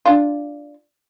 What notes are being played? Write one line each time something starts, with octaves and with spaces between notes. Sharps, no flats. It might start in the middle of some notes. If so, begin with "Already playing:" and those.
D4 F4